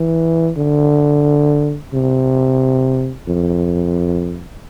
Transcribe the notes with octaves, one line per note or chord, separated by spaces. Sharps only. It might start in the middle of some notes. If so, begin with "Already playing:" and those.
Already playing: E3
D3
C3
F2